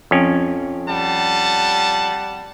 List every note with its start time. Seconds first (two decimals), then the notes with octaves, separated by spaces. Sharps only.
0.11 F2 C#4
0.86 G3 F#5 A5